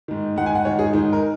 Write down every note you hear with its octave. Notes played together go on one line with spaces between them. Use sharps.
G#2 D#3
G#2 D#3 F#5
G#5
F#5
G#2 D#3 C#5
G#4
G#2 D#3 D#4
A#4